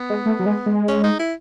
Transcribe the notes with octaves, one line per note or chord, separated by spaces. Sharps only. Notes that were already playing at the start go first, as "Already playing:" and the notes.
Already playing: B3
G#3
A3
F#3
G#3
G#3
C#4
D#4
E4